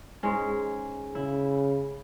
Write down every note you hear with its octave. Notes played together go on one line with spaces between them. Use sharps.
G#2 G#3 C#4
C#3 E4